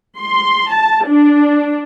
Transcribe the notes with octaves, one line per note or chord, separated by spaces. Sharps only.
C6
A5
D4